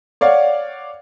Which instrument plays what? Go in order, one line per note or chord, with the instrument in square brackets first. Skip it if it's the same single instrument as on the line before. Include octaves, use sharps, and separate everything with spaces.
[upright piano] C#5 D5 F5 F#5